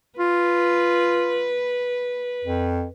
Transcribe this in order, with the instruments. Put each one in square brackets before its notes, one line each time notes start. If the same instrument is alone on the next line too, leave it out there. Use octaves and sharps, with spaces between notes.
[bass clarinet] F4 [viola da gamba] B4
[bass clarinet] F2